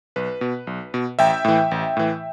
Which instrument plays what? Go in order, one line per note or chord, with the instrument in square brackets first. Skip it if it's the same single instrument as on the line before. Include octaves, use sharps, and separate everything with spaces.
[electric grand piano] B1 B4
B2
B1
B2
A1 E5 G5
A2 E3
A1
A2 E3